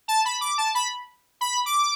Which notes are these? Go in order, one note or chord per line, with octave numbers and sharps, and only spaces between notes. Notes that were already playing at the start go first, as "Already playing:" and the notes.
A5
B5
D6
A5
B5
B5
D6